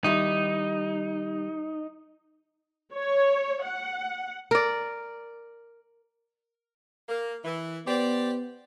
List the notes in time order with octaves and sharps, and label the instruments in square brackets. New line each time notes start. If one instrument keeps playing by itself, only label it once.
[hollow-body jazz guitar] D#3 G3 E4 [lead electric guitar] D#4
[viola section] C#5
F#5
[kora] A#4 D5
[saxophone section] A#3
E3
[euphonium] B3 [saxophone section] G4 C5 D5